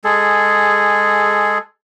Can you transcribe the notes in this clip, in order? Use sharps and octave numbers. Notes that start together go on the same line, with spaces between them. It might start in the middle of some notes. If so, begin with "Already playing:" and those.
G#3 G#4 A4